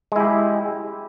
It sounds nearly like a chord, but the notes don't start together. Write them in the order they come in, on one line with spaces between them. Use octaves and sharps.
G#3 E4 G4